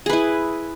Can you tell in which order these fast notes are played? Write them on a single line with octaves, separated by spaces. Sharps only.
G#4 B4 E4